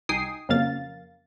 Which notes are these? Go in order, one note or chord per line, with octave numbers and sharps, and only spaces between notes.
C2 D#4 G5 G#5 D#6 C7
F2 C#3 F#3 A#3 F5 A6